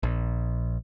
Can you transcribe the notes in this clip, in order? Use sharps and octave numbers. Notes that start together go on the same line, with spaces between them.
A#1